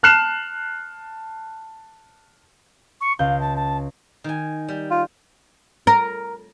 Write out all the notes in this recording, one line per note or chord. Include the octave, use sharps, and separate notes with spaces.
A5 F6 F#6 C7 E7
C#6
C#2 F5 G6
A5
A5
D#3 G#5
G3
F4
A#4